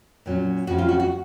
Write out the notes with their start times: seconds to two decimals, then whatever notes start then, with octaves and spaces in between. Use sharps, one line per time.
0.26 A#2 F#3 C#4
0.67 F#2 C#3 F3 C4 F#4
0.78 F4
0.89 F#4
1.00 F#4